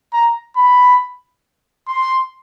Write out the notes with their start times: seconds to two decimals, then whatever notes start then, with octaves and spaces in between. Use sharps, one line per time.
0.13 A#5
0.56 B5
1.88 C6